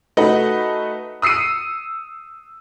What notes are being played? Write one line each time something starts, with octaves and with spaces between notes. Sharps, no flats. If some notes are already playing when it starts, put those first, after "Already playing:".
A3 D#4 F#4 B4 D#5
D#6 E6 C7 C#7 D#7